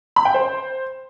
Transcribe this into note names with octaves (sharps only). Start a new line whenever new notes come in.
B5
G5
C5